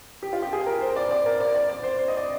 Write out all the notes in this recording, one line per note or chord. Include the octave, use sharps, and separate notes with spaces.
G4
F4
G4
G#4
A#4
C5
D5
D5
A#4
D5
D5
D5
C5
C5
D#5
D5